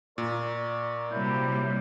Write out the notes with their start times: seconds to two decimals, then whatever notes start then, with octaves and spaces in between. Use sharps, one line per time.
0.18 A#2 A#4 D5 C#6
1.11 C3 F#3 G3 A#3 E4 G6